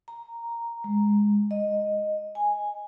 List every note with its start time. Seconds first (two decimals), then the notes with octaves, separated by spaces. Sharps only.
0.08 A#5
0.84 G#3
1.51 D#5
2.35 G#5